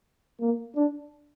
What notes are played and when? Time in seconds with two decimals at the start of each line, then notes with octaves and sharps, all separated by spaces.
0.41 A#3
0.76 D4